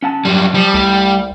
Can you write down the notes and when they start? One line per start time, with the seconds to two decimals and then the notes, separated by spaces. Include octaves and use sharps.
0.02 C#4 F#5 A5
0.25 F#2 F#3 G3
0.54 F3 G3
0.74 C2 A3 D5